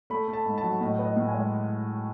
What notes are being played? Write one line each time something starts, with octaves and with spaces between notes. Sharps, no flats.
A3 B5
A3
A5
G#2
A5
F#3
A2 D#5
B3
D#5
A2
G#5
G#3